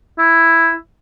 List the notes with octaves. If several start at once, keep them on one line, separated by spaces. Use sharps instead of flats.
E4